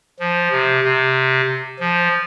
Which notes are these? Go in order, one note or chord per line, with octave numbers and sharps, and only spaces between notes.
F3
C3
C3
F3